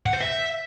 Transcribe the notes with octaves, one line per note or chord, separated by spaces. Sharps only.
F#5
C5
E5